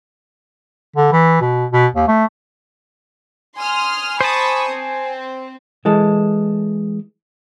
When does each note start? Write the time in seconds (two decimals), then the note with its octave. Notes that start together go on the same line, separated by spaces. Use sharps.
0.96 D3
1.12 E3
1.41 B2
1.72 B2
1.95 D#2
2.08 A3
3.57 G#5 C6 D#6 F6
4.21 C5 A5 B5 C#6 D#6
4.71 C4
5.85 E3 G#3 A4